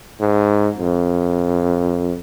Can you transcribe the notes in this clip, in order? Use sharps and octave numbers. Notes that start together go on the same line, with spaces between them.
G#2
F2